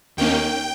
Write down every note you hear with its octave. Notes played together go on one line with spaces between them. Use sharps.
D#2 D#3 A#3 C#4 G5